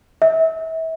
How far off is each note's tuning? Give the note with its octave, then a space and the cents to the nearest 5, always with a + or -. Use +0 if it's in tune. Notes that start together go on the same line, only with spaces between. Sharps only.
E5 -30